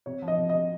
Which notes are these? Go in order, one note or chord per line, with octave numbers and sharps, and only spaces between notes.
C3 C#5
F3
D#5
C3
D#5
C3